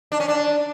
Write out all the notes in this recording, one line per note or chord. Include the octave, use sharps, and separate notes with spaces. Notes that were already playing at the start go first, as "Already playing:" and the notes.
D4
C#4
D4